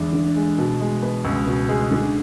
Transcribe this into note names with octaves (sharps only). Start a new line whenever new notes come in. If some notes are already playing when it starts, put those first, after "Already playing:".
Already playing: E2 D3 G#3 D4
D3
G#3
B2
G#3
B3
C#2
B2
G#3
D3